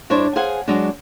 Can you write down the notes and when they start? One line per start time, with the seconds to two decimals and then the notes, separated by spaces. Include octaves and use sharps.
0.10 G2 D4 E4 C5 C#5
0.36 G#4 C5 F5 F#5 G#5
0.68 F#3 G#3 D4